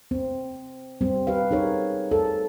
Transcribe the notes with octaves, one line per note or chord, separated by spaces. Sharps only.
C4
G3 C4
G4 B4 F5
D#4 G#4 A#4 C#5
A4